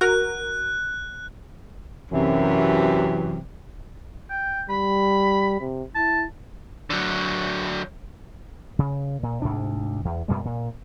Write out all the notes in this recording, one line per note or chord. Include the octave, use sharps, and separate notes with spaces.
F#4 A#4 F#6
F#2 C3 E3
G5
G3 B5
C3
E4 A5
D3 F#3
C#3
A#2
D2 G#2 C3 D4
E2
F#2 B2 G3 G#3
A#2